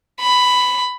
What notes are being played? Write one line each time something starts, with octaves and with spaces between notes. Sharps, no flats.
B5